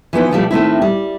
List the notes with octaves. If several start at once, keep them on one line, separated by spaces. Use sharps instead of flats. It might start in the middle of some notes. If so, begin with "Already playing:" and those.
E3 F3 B3 D#4
B2 F3 G3 A3
D#3 A3 C4 E4
G3